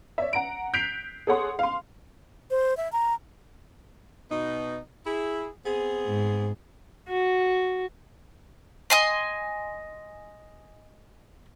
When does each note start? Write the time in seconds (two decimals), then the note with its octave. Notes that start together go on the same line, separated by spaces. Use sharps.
0.18 C#5 D5 E5
0.33 F#5 A#5 D7
0.73 F#6 G6 B6 C7 D7 F7
1.27 G#4 A4 C#5 F#5 C6
1.59 F5 C6
2.51 C5
2.77 E5
2.92 A#5
4.31 B2 D#4
5.06 E4 G#4
5.66 B3 C4 G#4
6.06 G#2
7.08 F#4
8.90 D#5 G#5 C6